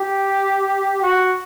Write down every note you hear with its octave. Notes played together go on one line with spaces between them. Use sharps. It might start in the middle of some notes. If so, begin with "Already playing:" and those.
Already playing: G4
F#4